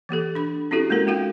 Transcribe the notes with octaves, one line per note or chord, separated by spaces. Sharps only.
E3 A#3 G4 A4
D4 B5
C4 C#4 E4 F#4 G4 A4
G#3 A#3 C#4 A#4
A#3 D#4 F4 F#4 F5 G5